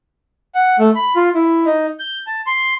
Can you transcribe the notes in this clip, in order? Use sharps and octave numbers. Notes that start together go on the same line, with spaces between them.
F#5
A3
B5
F4
E4
D#4
G6
A5
C6